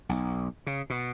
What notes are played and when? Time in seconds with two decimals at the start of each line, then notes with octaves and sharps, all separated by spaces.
0.09 B1
0.67 C#3
0.90 B2